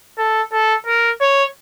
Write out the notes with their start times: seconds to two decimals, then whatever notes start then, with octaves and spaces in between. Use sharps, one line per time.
0.18 A4
0.52 A4
0.87 A#4
1.21 C#5